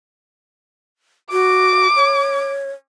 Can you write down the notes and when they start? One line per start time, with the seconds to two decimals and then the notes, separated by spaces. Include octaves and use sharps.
1.32 F#4 D6
1.96 C#5